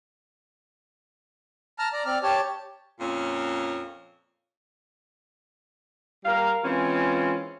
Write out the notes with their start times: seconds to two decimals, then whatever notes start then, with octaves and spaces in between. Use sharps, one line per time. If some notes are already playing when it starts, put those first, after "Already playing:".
1.79 A5 A#5 F6
1.93 D5 A#5
2.06 C4 D5 F6
2.23 G4 C#5 A5
3.00 F2 A#2 C#4
6.25 G3 A#4 F5
6.65 E3 G#3 C4 C#4 F4